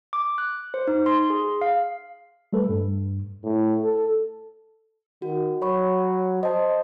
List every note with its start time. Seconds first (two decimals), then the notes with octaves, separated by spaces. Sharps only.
0.13 D6
0.38 F#6
0.74 C5
0.87 D#4
1.06 C6
1.30 G#4
1.61 F5
2.53 G3 A3 A4 B4
2.69 G2
3.44 A2
3.84 A4
5.22 D#3 F#4
5.62 F#3 C#5 B5 C#6
6.43 C5 D#5 A5